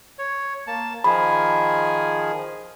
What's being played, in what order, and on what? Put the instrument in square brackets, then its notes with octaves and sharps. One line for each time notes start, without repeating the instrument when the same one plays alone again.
[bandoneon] C#5
A#3 A5
[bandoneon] D#3 F3 G#4 [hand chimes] B5